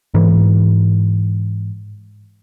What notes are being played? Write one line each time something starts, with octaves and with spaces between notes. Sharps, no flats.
G#2 E3